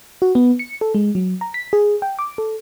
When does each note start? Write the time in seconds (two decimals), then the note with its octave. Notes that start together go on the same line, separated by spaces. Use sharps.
0.22 F#4
0.35 B3
0.59 C#7
0.81 A4
0.95 G#3
1.15 F#3
1.41 A#5
1.54 B6
1.73 G#4
2.02 G5
2.19 D6
2.38 A4